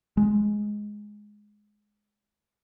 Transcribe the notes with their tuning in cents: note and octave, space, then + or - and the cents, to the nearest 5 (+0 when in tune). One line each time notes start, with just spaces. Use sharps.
G#3 +5